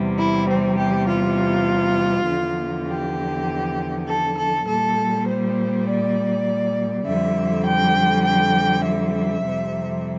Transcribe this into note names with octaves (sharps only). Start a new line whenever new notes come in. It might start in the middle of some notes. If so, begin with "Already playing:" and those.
Already playing: E2 C3 G3
E4
C4
G4
F4
E2 D3 F3
G4
A4
A4
A#2 G3 A4
C5
D5
F2 D3 G3 E5
G5
G5
E5
F2 C3 G3